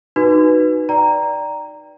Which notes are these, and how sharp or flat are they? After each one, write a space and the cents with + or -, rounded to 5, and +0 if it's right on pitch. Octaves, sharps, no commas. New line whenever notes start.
D#4 -15 F#4 +0 B4 +0
D5 +0 G5 -5 A#5 +0